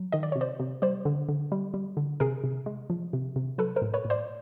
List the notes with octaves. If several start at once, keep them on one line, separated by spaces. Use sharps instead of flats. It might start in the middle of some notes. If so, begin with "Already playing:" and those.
Already playing: F#3
D#3 D#5
D5
C3 C#5
C5 D5
C3
G3 C5 D5
D3
D3
G3
G3
D3
C3 G#4 A#4
C3
G#3
F3
C3
C3
F#3 A4 B4
A#4 C5
A2
B4 C#5
A2
C5 D5